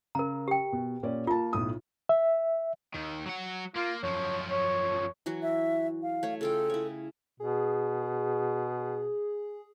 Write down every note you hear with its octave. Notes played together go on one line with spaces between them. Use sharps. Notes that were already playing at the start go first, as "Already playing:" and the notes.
C#3 A#4 A#5
G4 G5
B2
A#2 C#4 D5
A#3 F4 A5
B1 A2 D#6
E5
D#2 D#3
F#3 F#5
A#3 F4
F#2 F3 C#5
C#5
E3 F#3 F#4
E5
F5
A3 C#5
C#3 F4 A4 G5
E4 C#5
B2 G#4